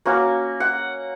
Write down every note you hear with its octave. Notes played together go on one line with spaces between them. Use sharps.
A#3 C#4 F#4
F#5